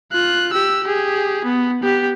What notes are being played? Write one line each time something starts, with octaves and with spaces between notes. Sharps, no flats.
F4 F#6
G4 E6
G4 G#4
B3
B3 G4